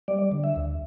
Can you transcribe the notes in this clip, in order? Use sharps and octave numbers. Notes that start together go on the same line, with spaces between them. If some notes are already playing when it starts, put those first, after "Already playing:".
G3 D5
D3
E5
D2